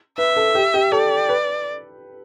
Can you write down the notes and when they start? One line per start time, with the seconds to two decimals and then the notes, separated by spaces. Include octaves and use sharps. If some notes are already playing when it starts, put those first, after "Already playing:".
0.18 B4 E5
0.36 A4
0.55 G4
0.74 G4
0.92 A4 D5
1.29 B4